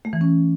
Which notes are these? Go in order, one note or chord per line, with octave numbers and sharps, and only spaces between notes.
A3
E3
C#4